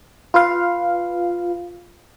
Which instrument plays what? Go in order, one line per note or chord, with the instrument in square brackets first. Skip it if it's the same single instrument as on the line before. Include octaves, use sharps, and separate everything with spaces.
[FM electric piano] F4 B4 F5